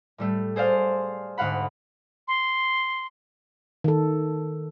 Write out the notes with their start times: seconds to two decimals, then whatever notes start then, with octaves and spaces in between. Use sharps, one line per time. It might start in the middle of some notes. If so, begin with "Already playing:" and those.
0.18 A2 G3 A3
0.56 G#4 C5 D5 F5
1.38 D2 G#2 F5 F#5 B5
2.28 C6
3.84 D#3 A4